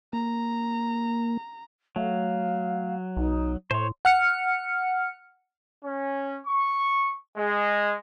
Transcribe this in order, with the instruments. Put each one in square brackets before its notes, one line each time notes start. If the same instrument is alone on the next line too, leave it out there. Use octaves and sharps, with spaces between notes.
[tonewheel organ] A#3 [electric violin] A#5
[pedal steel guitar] F#3 [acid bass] A3 [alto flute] F5
[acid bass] B1 [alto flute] D#4
[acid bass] A2 [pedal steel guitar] C5 C#5 [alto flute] C6
[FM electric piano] F#5 F6 C#7
[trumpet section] C#4
C#6
G#3